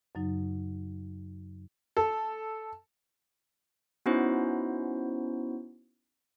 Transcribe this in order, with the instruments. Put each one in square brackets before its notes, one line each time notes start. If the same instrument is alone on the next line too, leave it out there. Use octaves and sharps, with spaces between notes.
[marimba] F#2 C#3 F#3 D#4
[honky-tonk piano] A4
[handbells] B3 C#4 D#4 E4 F#4 C5